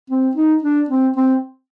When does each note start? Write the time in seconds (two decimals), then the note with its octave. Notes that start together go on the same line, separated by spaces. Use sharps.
0.10 C4
0.36 D#4
0.63 D4
0.89 C4
1.16 C4